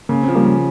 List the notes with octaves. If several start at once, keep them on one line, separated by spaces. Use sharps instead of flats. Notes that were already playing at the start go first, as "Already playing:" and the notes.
C#3 A#3
F3 C4
G3 A#3
C#3